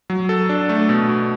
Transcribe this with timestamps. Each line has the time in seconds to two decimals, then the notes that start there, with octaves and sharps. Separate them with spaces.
0.10 F#3
0.29 A4
0.49 D4
0.69 A3
0.89 B2
1.08 B2